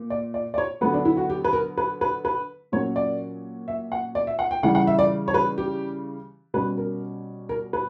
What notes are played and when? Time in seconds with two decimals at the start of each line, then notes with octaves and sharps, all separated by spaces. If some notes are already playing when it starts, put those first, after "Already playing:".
Already playing: A#2
0.10 D5
0.34 D5
0.54 D5
0.58 C#5
0.81 D3 F#3 B3 B4
0.93 D4
1.05 E4
1.17 F#4
1.30 G4
1.44 B4
1.53 A#4
1.77 B4
2.01 B4
2.25 B4
2.72 A#2 F#3 C#4 C#5
2.96 D5
3.68 E5
3.92 F#5
4.15 D5
4.27 E5
4.39 F#5
4.51 G5
4.63 C#3 E3 G3 F#5
4.75 F#5
4.87 E5
4.99 D5
5.28 C#5
5.34 B4
5.58 G4
6.54 B2 G3 C#4 B4
6.77 A#4
7.49 A#4
7.73 B4